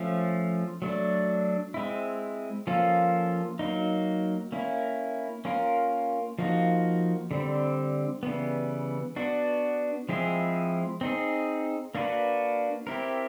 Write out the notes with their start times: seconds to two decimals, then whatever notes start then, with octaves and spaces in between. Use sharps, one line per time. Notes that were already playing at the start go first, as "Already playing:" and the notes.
Already playing: F3 A3 C#4
0.82 F#3 A3 D4
1.74 G#3 C4 E4
2.67 F3 A#3 C#4 F4 A4
3.59 F#3 A#3 D#4
4.52 A#3 C#4 E4
5.45 A#3 C#4 F4 A#4
6.39 F3 A#3 D#4 F#4
7.31 D3 G3 C4
8.23 C#3 E3 G3 B3
9.16 B3 D4 F#4
10.09 F3 G#3 C4 E4 G#4
11.01 C4 D#4 G#4
11.95 A#3 D4 F#4 B4
12.87 C4 E4 G4 A#4